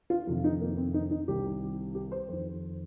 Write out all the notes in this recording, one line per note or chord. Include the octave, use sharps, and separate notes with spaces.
F4
F2 C3 D#3 F4
D#4
A#3
C4
D#4
D#4
C2 C3 D#3 G4
G4
C5
F2 D#3 C5